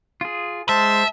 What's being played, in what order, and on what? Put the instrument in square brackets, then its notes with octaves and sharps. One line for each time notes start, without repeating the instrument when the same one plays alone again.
[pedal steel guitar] F4 G#4
[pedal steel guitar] G#3 [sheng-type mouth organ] C5 C6 [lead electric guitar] E5 [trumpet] A5